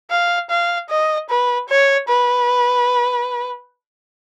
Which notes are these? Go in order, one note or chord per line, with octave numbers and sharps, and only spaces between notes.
F5
F5
D#5
B4
C#5
B4